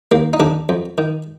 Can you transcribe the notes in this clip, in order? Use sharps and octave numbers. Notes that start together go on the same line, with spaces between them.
D#2 A#3
D#4
D#2 D3 D4
F2
D#3